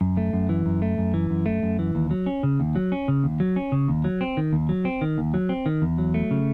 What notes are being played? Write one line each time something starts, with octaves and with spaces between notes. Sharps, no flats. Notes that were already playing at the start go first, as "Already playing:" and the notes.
F#2
A3
F#2
E3
F#2
A3
F#2
E3
F#2
A3
F#2
E3
D#2
F#3
C#4
C#3
D#2
F#3
C#4
C#3
D#2
F#3
C#4
C#3
D#2
F#3
C4
D#3
D#2
F#3
C4
D#3
D#2
F#3
C4
D#3
E2
F#3
A3
C#3